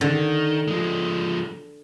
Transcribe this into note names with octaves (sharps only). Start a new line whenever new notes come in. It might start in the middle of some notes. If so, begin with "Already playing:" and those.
D3 D#3
F3 G#3